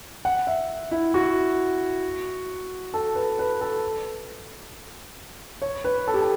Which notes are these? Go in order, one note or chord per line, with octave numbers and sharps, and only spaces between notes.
F#5
E5
E4
F#4
A4
B4
B4
A4
C#5
B4
A4
G4
A4